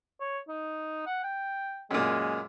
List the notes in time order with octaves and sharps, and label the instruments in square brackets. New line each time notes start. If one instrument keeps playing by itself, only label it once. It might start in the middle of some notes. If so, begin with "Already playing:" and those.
[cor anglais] C#5
D#4
F#5
G5
[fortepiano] F#2 A#2 [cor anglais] G#3